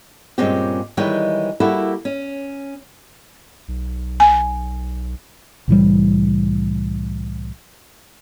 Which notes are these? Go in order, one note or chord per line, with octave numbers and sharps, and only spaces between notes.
G2 A#2 G#3 C4 C#4 G4
D#3 E3 G3 G#3 C#5 G5
G3 A#3 E4 F#4 G4 A4
C#4
B1
G#5
C2 A2 E3 G3